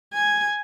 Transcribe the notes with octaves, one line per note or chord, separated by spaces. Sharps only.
G#5